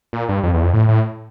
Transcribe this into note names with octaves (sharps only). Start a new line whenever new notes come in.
A#2
G2
F2
E2
F2
A2
A2